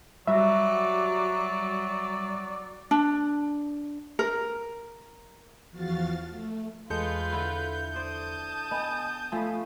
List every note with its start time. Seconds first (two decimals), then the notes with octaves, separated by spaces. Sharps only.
0.27 F#3 G3 F#4 D5 E5
2.91 D4
4.19 A#4
5.71 E2 F3 F#4 F5 F6 A6
6.29 A3
6.90 E2 G#3 F4 A4 B4 G6 C#7
7.32 D3 E4
7.96 C5 D5 A5 D#6
8.71 B3 D#5 G#5
9.32 F3 A3 G#5 B5